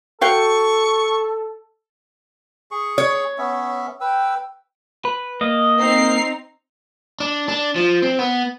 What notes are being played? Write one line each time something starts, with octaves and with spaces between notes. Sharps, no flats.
F#4 A4 F5 G5 C#6
G#4 C#6
C#5
B3 C#4 E5
B4 G5 E6
B4
A#3 D#5
C4 D#4 C7
D4
D4
F3
C4
B3